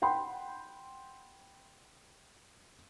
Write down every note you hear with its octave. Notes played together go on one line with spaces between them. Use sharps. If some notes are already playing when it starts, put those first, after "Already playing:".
F#5 G5 B5 C6